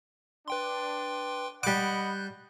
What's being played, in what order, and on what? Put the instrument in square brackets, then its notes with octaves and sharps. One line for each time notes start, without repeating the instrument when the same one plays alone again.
[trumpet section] D4 [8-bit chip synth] B4 G5 C6
[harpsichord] G3 D6 [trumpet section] D#5 F#5 B5 [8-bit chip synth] F#6 G6